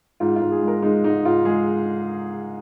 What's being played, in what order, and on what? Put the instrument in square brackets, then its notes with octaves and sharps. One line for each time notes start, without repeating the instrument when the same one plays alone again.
[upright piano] G#2 F4
F4
G#2
G#4
G#3
A#4
G#3 D#4
G#2 D#4
G#2 F4
G#3 G#4